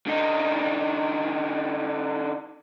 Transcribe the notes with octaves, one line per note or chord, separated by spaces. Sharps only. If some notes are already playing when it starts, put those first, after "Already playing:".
D3 D#4